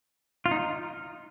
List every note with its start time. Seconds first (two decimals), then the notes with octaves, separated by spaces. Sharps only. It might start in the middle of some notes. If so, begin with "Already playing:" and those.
0.46 F4
0.51 D#4